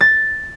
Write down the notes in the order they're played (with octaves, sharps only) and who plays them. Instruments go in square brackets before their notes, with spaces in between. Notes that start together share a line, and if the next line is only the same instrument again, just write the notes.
[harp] A6